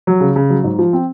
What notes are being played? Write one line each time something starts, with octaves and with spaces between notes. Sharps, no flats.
F#3
C#3
C#3
F#3
G#2
F3
C4